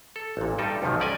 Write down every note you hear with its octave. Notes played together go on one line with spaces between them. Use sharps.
A4
A1 A#2
G2 G3 D#4 A4 G5
B1 F2 G#2 C3 D#3 F3
G3 C#4 D5 D#5 G#5